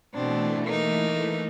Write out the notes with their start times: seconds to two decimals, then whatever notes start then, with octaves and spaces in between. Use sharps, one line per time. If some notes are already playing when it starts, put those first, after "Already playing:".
0.14 B2 E3 A3 C4 D4
0.64 A#3 D#4